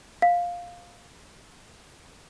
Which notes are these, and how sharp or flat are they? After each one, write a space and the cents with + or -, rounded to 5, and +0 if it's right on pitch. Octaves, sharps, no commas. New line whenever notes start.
F5 +10